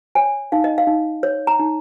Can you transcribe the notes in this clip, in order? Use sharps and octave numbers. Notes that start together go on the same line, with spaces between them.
C#5 G#5
D#4 F5
D#5
F5
D#4
C#5
A#5
D#4